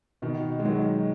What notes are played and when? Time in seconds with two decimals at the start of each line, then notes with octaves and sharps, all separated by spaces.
0.22 B2 D#3
0.59 G#3
0.65 D#3 F#3